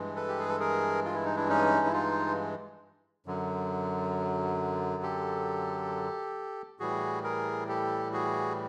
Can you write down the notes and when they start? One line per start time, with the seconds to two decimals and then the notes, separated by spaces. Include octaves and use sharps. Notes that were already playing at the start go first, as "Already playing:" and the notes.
Already playing: G2 E3 G#3
0.16 A4 B4
0.28 G4
0.39 G#4
0.49 A4
0.60 G#4 A#4
1.05 F4
1.14 E4
1.25 D#4
1.36 D4 E4
1.49 C#4 D#4
1.86 E4
1.93 D#4 F4
3.26 F#2 D3 F#3
5.03 G4 A4
6.79 A2 E3 G3 F#4 G#4
7.24 G#4 A#4
7.69 G4 A4
8.13 F#4 G#4